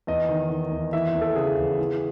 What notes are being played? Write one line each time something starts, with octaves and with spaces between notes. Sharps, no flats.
E2 D#5
D#3
D#3
E2
E3 E5
E5
E2
A4
C#3 G#4
E2
E3